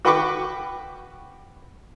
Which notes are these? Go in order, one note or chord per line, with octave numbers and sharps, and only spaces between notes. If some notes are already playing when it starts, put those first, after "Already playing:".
F#4 B4 G5 B5 C#6 D6